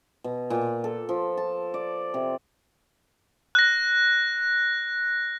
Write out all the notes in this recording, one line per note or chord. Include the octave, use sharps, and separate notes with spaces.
B2
A#2
A4
F3
A5
D5
C3
F#6 A#6